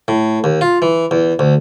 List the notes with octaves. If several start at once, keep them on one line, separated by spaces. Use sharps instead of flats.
A2
D#2
F4
E3
E2
D2